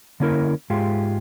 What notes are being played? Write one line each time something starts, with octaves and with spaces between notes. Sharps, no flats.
D3 A#3 C#4 E4 A#4
G#2 G#3 F4 G4